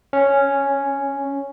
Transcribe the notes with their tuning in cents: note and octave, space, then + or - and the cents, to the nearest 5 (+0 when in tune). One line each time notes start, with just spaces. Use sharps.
C#4 +0